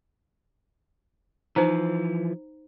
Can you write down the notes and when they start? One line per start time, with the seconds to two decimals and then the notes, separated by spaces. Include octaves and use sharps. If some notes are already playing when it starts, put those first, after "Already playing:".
1.56 E3 F3 D#4 C5 A#5